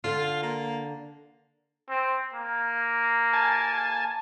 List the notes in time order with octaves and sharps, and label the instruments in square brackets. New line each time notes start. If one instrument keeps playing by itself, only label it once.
[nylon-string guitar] D3 [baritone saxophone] F4
[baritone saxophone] A#3
[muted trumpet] C4
A#3
[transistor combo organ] G#5 A5